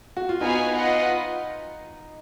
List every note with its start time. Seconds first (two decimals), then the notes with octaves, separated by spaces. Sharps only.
0.17 F#4
0.29 F4
0.41 B3 D#4 F#4 B4 F5 G#5
0.76 F4 B4 D#5 F#5